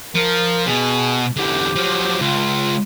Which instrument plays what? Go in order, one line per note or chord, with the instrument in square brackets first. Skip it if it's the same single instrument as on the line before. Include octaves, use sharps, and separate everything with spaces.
[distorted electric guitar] F3 [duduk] A#4
[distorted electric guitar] B2 [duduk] G#4
[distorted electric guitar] E2 D3 [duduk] G4
[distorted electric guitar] F3 F#3
[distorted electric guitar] C#2 [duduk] F4